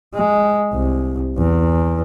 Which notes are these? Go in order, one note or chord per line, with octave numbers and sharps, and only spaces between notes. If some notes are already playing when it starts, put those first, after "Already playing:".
G#3
C2
E2